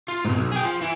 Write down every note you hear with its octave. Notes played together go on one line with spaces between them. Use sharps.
F4
G#2 B2
B1
G#4 G5
F3
E3